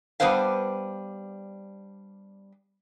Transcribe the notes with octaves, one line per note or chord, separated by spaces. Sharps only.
G3 B3 D4 B4 C5 F5